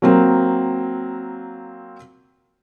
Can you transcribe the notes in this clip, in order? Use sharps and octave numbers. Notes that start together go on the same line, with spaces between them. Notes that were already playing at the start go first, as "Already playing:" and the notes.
F#3 A#3 C4